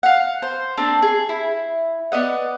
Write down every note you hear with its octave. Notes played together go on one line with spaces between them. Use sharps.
F5 F#5
C5
A#3 C4 D4
G#4
E4
B3 D5 D#5 F#5